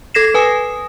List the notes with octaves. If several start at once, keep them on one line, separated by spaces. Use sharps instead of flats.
A4 G#6 A#6 C7 E7
B4 G#5 D#6